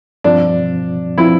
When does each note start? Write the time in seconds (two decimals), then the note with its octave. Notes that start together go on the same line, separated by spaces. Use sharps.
0.24 G2 F3 C4 D4 F4
1.18 F3 C4 E4 F4